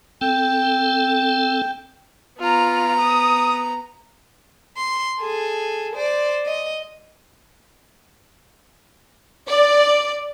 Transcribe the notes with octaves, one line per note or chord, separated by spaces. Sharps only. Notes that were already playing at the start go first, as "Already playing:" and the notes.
C4 A4 G5
B3 F4 A#5
D#6
C6
G#4 A4
C5 D5
D#5
D5